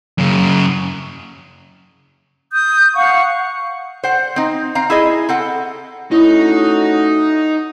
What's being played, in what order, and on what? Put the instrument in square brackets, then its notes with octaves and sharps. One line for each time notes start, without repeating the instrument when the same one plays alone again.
[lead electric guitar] F#2 C#3
[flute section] D#6 G6
F5 F#5 C#6
[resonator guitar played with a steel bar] C5 F#5
C4 D#4
C4 F5 A#5
E4 G#4 D#5
C4 A4 F#5
[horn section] A3 C#4 F#4 [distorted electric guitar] D#4 [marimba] E4